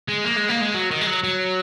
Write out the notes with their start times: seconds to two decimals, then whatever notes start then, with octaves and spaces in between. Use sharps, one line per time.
0.09 G#3
0.25 A#3
0.37 G#3
0.49 A#3
0.61 G#3
0.75 F#3
0.91 D#3
1.01 G#3
1.06 F#3
1.24 F#3